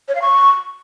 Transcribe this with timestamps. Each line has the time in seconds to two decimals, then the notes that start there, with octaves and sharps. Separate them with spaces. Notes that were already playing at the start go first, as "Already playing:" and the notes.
0.08 C#5
0.15 F5
0.22 C#6